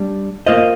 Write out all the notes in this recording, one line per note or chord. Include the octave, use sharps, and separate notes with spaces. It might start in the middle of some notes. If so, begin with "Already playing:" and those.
Already playing: G3 D4
A#3 F4 C5 D#5